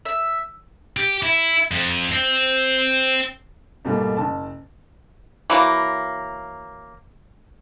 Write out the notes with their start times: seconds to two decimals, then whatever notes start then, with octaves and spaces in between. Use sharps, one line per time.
0.05 E5
0.97 G4
1.23 E4
1.71 F2
2.12 C4
3.85 G#2 B2 G3 A3 A#3
4.17 F#1 A5
5.50 E3 F#3 A#3